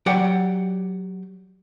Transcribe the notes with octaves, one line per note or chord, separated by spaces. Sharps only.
F#3 G4 D5 F#5 G5